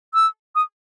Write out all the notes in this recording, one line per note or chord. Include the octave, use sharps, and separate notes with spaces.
E6
D#6